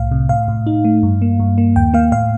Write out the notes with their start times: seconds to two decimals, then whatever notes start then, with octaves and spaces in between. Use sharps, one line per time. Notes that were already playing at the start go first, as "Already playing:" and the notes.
Already playing: C2 A2 F5
0.12 C3
0.29 A2 F5
0.48 A2
0.67 D#4
0.85 A3
1.03 G2
1.22 A#3
1.40 G2
1.58 A#3
1.76 D#2 G5
1.94 A#3 F5
2.12 A2 F5